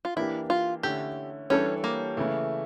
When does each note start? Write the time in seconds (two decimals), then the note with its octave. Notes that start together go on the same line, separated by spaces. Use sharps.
0.05 F4
0.16 E3 A#3 D4 E4 G4
0.50 F4
0.83 D3 A3 C#4 E4 G4
1.50 E3 G3 C#4 D4 A4 C#5
1.84 A#3
2.17 C#3 E3 A3